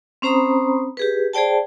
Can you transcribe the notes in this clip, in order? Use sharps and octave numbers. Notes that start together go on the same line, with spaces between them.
C4 C#4 C5 A#5 B5 D#6
G4 G#4 B4
G#4 C5 D5 G5 A5